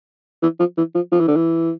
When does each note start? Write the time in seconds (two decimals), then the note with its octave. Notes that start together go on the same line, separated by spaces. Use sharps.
0.42 E3
0.59 F3
0.77 E3
0.95 F3
1.12 F3
1.20 E3
1.28 D3
1.36 E3